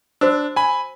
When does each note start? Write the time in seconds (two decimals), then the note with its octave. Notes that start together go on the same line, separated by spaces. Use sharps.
0.21 D4 F#4 C5 E6
0.56 G#5 B5